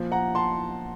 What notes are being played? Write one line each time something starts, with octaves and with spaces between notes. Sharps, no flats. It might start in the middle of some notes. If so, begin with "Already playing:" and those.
Already playing: A#2 F3
F#5 A#5
A5 C6